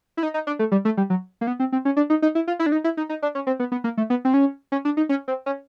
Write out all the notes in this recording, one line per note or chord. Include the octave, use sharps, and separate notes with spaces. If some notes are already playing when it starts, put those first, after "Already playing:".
E4
D#4
D#4
D4
A3
G3
A3
G3
F#3
A#3
B3
C4
C4
C#4
D4
D#4
D#4
E4
F4
E4
D4
D#4
E4
D#4
D#4
D4
C#4
C4
B3
B3
A#3
A3
B3
C4
C#4
C#4
D4
D#4
C#4
C4
C#4